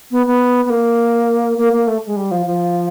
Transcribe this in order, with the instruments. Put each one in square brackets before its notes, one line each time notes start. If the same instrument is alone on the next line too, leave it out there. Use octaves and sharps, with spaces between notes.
[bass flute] B3
B3
B3
A#3
A#3
A#3
A3
G#3
G3
F3
F3